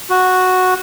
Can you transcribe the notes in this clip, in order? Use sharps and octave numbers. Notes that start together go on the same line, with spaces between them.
F#4